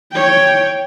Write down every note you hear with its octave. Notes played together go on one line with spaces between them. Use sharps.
C#5 G5